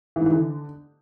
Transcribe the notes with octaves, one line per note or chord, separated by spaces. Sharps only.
E3
G#2
E3
D3